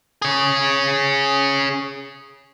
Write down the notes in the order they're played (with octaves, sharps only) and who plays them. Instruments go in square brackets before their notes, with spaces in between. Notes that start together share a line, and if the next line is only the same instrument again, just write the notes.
[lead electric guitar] G#4 C#5